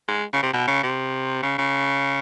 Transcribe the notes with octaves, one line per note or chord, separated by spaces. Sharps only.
G#3
C#3
C3
B2
C#3
C3
C#3
C#3